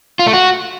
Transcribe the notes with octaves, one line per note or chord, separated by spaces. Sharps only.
F4
A3
F#4